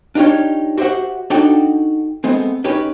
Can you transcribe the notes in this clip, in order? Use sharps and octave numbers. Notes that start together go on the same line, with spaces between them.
D4 D#4 F4 G4 C#5
F#4 G4 C5 E5 F#5
D4 D#4 F#4 A4 G5
G#3 A3 B3 C4
C#4 D#4 G4 B4